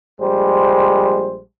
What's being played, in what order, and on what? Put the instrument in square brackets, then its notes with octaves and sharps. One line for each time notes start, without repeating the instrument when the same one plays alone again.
[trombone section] A#1 G3 G#3 C5